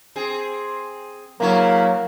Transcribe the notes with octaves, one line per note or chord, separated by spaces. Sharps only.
C4 G#4
C#3 F#3 A#3 E4 C#5